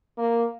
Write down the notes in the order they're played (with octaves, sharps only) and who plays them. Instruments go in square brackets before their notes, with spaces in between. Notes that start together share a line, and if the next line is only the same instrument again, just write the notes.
[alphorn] A#3